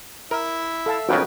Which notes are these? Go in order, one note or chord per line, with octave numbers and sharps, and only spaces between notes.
E4 A#4 E5
A4 F5 A5
B1 F2 C#3 F#4 A#4 B4 G5